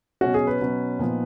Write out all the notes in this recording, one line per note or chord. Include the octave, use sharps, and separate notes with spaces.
B2 F#3 C#4 F#4
G#4
B4
B2 F#3 C#4
A#2 F3 B3 D#4